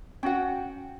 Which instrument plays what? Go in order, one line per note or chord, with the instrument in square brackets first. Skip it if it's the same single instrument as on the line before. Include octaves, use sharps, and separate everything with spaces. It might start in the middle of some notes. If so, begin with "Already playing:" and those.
[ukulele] C#4 F#5 [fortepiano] F#4 G5